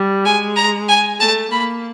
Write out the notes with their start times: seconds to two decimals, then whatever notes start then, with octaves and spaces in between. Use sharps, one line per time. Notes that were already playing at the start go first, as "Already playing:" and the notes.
Already playing: G3
0.25 G#3 G#5
0.56 A#5
0.88 G#5
1.20 A3 A5
1.51 A#3 B5